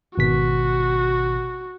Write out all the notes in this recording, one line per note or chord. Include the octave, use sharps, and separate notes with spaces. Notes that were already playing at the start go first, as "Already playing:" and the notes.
G#1 B2 F#4 B6